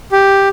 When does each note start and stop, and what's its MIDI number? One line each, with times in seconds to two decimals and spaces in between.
0.12 0.49 67